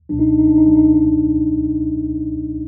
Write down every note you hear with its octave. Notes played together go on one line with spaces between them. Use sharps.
C#2 B2 F#3 D4
D#4
D4
D#4
D4
D#4
C#2 B2 F#3 D4
D#4
D4
D#4
D4